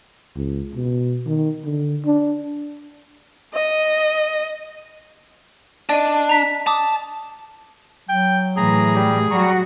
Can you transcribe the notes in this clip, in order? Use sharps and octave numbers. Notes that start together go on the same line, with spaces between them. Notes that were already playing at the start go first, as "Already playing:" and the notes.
C#2
B2
D#3
D3
D4
D#5
D4 D5 D#5 D#7
A#5 B6
A5 D6 D#6
F#3 G5
A2 E3 G#4 A#5
G3 G4
F#3 G3 F#4 A#5 C#6